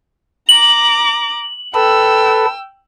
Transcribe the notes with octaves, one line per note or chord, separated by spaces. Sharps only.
A#5 D6 F#7
A4 B4 G5 E6